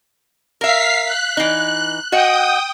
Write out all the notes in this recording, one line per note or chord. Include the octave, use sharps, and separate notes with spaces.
A#4 E5 F5 B6 C7
F#6
E3 D#4
F#4 D#5 F#5 G5 D#6